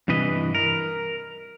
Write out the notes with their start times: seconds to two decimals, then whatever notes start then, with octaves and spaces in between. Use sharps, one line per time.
0.08 G2 C3 E3 B4 D#5
0.55 A#4